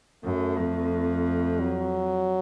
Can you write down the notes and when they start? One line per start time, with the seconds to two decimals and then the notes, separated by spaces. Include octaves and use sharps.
0.24 F#2 A3
0.57 F2
1.60 F#3